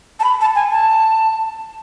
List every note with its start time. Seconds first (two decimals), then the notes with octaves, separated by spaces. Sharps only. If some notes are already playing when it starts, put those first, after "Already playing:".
0.20 A5
0.24 B5
0.41 A5
0.55 G#5
0.71 A5